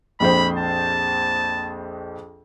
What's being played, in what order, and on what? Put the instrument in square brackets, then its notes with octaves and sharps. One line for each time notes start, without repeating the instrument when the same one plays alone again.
[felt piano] A#1 F2 C5 [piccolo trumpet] B5
[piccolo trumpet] A5